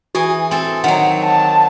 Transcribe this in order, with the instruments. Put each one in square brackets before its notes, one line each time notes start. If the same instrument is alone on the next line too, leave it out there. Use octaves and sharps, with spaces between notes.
[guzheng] E3 G#4 [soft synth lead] F#4
[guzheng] C4 A4
[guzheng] D#3 F#3 [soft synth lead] F#5
[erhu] A5